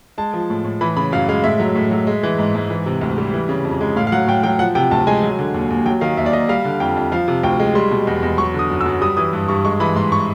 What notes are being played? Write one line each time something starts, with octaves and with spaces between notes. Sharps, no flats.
G#3 A5
F3
A2
A2
E3 B5
C#3 B5
F#2 F5
G#3 F5
A2 E5
F#3
A2
F#3
G#3
E3
G#2
G#2
E3
C3
D2
G3
E3
C#3
F2
G#3
A2 F5
F5
F#3 F#5
A2 G5
F#3 G5
F3 F#5
C3 G5
D2 A5
G#3 G#5
F#3
D3
D#2
D#2
F#3 G5
D#3 F5
D#2 E5
D5
D#2 D#5
G3 F5
D3
F2 G5
F2
F3 F5
C3
D2 G5
G#3
G3 C6
B2
E2
E2
F#3 C#6
D3 D#6
F#2
E6
F#2
G3 D#6
E3 D#6
G2
G2 C#6
G#3 C#6
E3 B5
G#2 C6
C#6